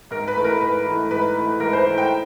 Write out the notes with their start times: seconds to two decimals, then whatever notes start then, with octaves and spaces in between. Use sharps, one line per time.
0.11 G#2 A#4
0.28 B4
0.36 E3 A3
0.44 A#4
0.61 G#2 B4
0.86 E3 A3
1.10 G#2 B4
1.36 E3 A3
1.60 G#2 A#4
1.73 C5
1.85 E3 A3
1.98 G5